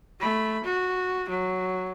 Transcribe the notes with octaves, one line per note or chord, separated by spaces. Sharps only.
A3 B5
F#4
F#3